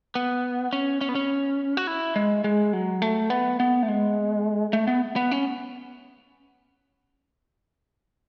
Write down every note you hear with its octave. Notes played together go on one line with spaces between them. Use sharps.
B3
C#4
C#4
B3
C#4
F#4
E4
G#3
G#3
F#3
A3
B3
B3
A3
G#3
A3
B3
B3
C#4